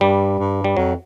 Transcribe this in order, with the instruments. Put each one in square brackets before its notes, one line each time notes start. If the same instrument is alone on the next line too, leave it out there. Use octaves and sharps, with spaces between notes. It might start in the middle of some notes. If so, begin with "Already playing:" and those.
[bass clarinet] G2 [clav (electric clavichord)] G3
[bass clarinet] G2
[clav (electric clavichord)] G3
[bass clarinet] F2 [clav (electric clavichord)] F#3